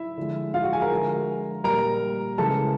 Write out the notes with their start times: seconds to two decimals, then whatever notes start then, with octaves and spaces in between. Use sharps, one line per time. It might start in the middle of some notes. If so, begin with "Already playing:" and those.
Already playing: E4 E5
0.17 D3 F3 G#3
0.54 F4 F5
0.63 F#4 F#5
0.72 G#4 G#5
0.82 A#4 A#5
0.90 D3 F3 G#3
1.64 A#2 G3 A#4 A#5
2.38 C#3 E3 G#3 A4 A5